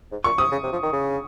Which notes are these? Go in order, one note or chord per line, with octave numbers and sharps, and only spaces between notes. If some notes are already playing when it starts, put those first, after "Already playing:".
G#2
A#2 C#6
C3 D#6
C#3
C3
F3
D#3
C#3